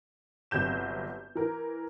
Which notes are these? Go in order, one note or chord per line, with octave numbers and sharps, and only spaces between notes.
G1 C3 F#3 G6 E7
E3 A#4